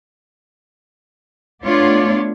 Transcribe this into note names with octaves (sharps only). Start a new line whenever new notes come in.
A3 B3 D4 F4 C#5 D5